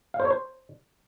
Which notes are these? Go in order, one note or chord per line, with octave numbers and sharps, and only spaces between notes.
F5
C5
C#5
C5